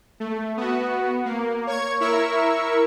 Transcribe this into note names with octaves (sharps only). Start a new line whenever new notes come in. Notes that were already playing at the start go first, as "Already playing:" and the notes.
A3
B3 F#4
A#3
C#5 C#6 G#6
E4 A#4 E5 C#6 E6